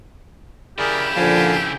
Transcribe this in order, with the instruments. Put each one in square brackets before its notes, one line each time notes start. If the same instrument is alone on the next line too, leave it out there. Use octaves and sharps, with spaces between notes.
[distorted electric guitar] C#3 E4 [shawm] G4 [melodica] G#4 A#4 D5
[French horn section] A#2 D3 F3 [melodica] F5 G#5 A5